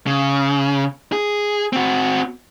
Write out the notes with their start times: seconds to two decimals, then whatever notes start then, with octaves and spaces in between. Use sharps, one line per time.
0.07 C#3
1.13 G#4
1.73 C4 F#4